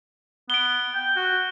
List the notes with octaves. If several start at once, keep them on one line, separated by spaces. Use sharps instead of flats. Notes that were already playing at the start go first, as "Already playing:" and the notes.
B3 D7 G7
G5
F#4